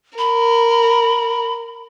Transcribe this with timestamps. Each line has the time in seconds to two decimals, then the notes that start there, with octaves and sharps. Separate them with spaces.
0.18 A#4 B5